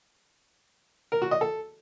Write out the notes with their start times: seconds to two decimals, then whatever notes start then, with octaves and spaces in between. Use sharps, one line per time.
1.12 A#4
1.22 F#4
1.31 D#5
1.41 A4